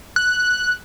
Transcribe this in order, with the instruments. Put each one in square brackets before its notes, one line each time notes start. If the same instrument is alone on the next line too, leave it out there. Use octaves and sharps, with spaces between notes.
[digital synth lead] F#6